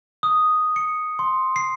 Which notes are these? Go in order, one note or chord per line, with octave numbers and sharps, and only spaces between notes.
D#6
C#7
C6
C7